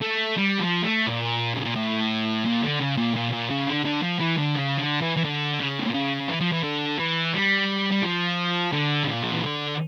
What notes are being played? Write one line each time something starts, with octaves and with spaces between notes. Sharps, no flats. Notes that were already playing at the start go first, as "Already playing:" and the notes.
A3
G3
F3
A3
A#2
C#3
A#2
A2
A#2
D3
C#3
A#2
A#2
A#2
C#3
D3
D3
F3
E3
D3
C#3
D3
E3
E3
D3
C#3
A2
A#2
C#3
E3
F3
E3
D3
E3
G3
G3
F3
D3
C#3
A#2
F3
E3
D3